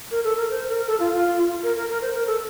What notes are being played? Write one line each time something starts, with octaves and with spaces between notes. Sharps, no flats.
A#4
A4
A#4
C5
A#4
A4
F4
F4
A#4
A#4
A#4
C5
A#4
A4